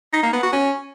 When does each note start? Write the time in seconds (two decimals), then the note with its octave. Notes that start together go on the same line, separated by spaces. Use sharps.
0.13 D#4
0.23 A#3
0.33 B3
0.43 F#4
0.53 C#4